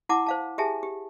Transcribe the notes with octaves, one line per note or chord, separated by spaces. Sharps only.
E4 F#5 A5 D6
C5 F5 A5
G4 G#4 E5 G#5 A5
G4